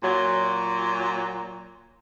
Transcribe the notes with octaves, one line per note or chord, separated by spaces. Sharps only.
A#2 F#3